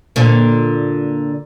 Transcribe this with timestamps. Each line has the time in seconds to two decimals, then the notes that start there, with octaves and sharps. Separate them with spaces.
0.16 A#2 D3